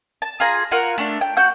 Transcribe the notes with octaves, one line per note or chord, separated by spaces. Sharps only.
A5
F4 G#4 A#5
F4 F#4 A#4 F#5
A3 D4
G5
F#4 F#5 G6